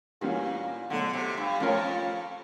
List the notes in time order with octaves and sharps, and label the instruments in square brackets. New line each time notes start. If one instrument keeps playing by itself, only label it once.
[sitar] A#2 [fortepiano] E3 G3 A#3 C#4 F#4
[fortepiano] B2 F#3 A3 [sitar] D3
[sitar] C3
G2
[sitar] F2 [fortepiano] A3 C#4 F4 A#4 C#5